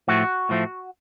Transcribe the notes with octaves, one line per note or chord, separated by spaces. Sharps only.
A2 F3 A3 F#4
A2 F3 A3